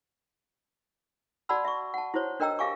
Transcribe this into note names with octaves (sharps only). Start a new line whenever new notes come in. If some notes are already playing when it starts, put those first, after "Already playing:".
F#4 D5 F#5 A5 B5 E6
E5 C#6
F#5 A5
E4 F#4 C5 C#5
D4 A#4 D#5 G5 A#5 E6
G4 E5 F5 G#5 C#6 D6